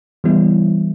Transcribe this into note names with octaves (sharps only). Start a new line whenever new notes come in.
E3 G3 B3 E4